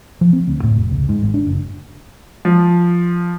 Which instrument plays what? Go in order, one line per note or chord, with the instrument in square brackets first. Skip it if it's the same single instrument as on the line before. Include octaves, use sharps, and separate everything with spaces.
[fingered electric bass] F3
C4
D2
A2
F1
C#2
G#2
G#1
D4
F#1
[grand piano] F3